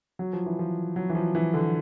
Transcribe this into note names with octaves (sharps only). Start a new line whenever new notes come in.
F#3
F3
E3
F3
F#3
E3
F3
E3
D3